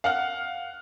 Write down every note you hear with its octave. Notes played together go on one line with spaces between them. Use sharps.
F5 F#5 F6